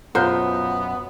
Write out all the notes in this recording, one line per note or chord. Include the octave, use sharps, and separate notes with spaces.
F#2 B2 B3 F4 C5 A#5 F#6